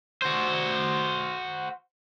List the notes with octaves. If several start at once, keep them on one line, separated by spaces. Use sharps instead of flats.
F#4 C5